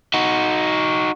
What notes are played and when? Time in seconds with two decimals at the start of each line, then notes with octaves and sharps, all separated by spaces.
0.14 D#4 F#4